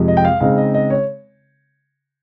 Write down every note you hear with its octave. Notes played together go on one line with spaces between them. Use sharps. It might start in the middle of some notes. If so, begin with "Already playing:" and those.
Already playing: F2 C3 F3 G#3
D#5
G5
F5
C#3 G#3 C4 D#4 F5
D#5
D#5
C#5